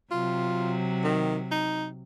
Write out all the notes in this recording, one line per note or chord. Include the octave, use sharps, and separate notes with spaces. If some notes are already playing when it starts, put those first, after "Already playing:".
C3 F#3 F4
D#3
D#4